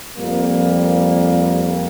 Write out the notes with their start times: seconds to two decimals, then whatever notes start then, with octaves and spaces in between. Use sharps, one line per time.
0.18 F2 G3 A#3